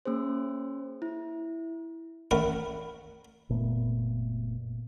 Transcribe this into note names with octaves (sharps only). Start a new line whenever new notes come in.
A#3 C#4 G#4 C5
E4
A1 A3 A#4 F#5 B5
F#1 A#2 A3 B3